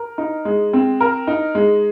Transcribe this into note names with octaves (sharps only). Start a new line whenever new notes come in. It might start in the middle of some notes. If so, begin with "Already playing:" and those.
Already playing: A#4
D#4
G#3
C4
A#4
D#4
G#3